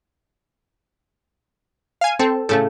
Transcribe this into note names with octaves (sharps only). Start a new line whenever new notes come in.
F5 G#5
C4 A4
A2 C#3 A3 A4